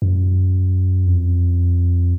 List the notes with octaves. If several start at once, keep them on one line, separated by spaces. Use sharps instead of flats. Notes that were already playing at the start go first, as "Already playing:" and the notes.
F#2
F2